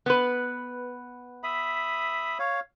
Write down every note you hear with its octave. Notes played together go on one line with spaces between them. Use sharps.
B3 B4
E5 B5 D#6
C#5 F5